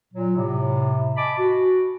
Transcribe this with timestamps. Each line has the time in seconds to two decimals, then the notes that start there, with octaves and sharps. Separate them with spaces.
0.14 A#2 F#3
0.36 A2 C3
1.17 D#5 G#5 A5 B5 D6
1.39 F#4